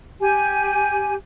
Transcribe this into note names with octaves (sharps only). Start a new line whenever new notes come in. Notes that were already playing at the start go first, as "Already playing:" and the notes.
G4 G#5